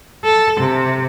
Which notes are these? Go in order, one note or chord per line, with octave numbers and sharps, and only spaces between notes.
A4
C3